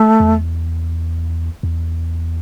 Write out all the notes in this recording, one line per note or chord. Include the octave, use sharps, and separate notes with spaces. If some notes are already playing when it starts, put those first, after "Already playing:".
Already playing: A3
E2
E2